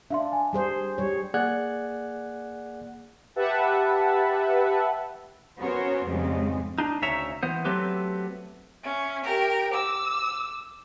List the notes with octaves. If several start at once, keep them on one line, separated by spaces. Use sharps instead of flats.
D4 E5 F5 C6
G#5
G3 G#4 C5
G3 C#5
A#3 G#4 D5 F#5 F#6 G#6
G4 B4 E5 F#5 A5
B3 C#4 F#4 A#4 C5 C#5
F2 G#2 C#3 G3 G#3 C4
D4 D#4
D2 C#3 C#5 E5 A#5
E3 B3 C5
F#3 A3 B3 C4 G4 B4
C#4 E5
G4 A#4
D6 E6
D6